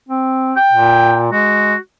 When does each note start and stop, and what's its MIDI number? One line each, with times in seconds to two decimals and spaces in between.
0.09 0.54 60
0.56 1.22 79
0.72 1.31 46
1.32 1.74 56
1.32 1.76 66